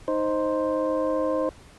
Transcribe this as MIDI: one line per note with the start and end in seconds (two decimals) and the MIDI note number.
0.08 1.49 63
0.08 1.49 72